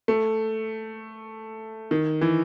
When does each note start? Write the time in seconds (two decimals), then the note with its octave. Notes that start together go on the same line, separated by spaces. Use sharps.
0.08 A3
1.91 D#3
2.21 E3